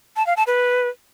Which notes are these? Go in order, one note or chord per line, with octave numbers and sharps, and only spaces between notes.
A5
F5
A5
B4